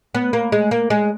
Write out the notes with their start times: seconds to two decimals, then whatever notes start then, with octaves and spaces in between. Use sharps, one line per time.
0.15 B3
0.33 A#3
0.52 G#3
0.71 A#3
0.90 G#3